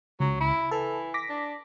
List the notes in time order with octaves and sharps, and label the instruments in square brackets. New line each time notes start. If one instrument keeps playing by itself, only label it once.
[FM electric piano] C#2 [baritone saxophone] F#3
[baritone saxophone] E4
[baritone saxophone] E3 [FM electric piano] A4
[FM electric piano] D6 A#6 B6
[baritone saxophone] D4